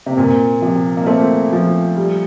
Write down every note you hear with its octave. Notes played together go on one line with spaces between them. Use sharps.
C3
A#2 C4
C3 F3
A#3
A3 C4
F3
G3